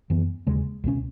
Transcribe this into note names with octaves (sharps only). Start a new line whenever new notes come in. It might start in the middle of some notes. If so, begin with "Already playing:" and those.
F#2 E3 B3
D#2 C#3 G#3
C#2 B2 G#3 C#4